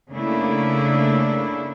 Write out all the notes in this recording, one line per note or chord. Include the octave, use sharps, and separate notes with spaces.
C#3 A3 A#3 D4 E4